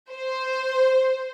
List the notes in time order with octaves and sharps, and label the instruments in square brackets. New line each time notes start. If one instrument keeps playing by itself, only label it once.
[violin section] C5